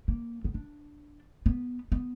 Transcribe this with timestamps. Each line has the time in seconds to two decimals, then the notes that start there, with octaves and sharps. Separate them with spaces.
0.08 A#3
0.45 B3
0.54 D4
1.46 B3
1.92 B3